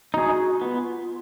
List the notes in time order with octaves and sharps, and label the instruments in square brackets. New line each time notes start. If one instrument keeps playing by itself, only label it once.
[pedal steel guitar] D#4 G#4 [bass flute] F#4
[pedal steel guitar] B3 [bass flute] F4